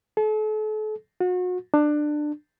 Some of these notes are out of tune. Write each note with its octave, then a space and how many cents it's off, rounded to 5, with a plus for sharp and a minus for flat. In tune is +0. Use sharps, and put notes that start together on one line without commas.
A4 -40
F#4 -35
D4 +20